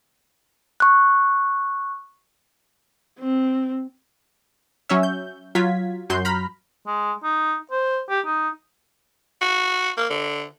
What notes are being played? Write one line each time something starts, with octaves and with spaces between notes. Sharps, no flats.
C#6 F#6
C4
F#3 C#4 C#5 E5
G6
F#3 F4 G#6 B6
F#2 F#3 C6 G6
A#5 B5 F6 B6
G#3
D#4
C5
G4
D#4
F#4
A#3
D3